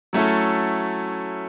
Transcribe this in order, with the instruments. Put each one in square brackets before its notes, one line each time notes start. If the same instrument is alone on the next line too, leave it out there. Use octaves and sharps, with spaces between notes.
[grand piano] F#3 A3 C#4 E4 A4